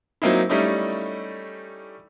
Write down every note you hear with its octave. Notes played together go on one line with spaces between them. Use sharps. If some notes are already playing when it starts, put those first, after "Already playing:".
F#3 A#3 C4 D#4 E4
G3 A3 C#4 D#4 E4